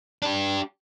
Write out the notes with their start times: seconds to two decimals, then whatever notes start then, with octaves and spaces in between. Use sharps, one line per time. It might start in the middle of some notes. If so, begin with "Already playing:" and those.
0.22 D4 G4